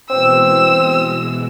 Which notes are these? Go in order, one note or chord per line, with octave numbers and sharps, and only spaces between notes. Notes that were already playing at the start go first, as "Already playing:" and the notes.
B2 E3 G#3 C4 E6